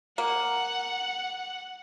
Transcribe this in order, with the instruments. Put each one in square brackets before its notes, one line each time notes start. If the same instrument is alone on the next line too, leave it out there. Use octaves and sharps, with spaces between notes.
[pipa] A#3 [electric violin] F#5